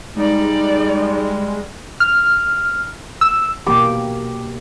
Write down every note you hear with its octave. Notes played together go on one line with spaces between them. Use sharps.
G3 G#3 D#4 D5
F6
E6
B2 A#3 G4 D6